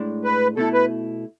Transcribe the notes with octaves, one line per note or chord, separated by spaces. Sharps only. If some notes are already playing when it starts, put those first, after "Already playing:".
Already playing: A2 G#3 D4
B4
B2 A3 E4 A4
B4